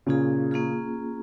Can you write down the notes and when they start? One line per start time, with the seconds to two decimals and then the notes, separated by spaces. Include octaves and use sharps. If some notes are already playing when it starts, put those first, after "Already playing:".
0.06 A#2 C#3 A#3 C#4 F4 G#4
0.51 A#3 C#4 F4 G#4